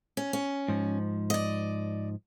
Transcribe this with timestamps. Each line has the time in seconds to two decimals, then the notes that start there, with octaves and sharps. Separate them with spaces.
0.17 C#4
0.33 C#4
0.68 G#2 F3
1.30 D5 D#5